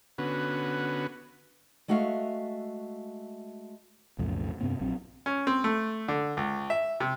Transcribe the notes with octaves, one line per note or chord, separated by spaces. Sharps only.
D3 B3 C#4 F#4 B4
G#3 A3 F#4 E5 F5
B1 F2 A2 C#3
G2 C3 B3 C4
A#1 F#3 C4
C#4
C4
A3
D3
C#2
E5
C3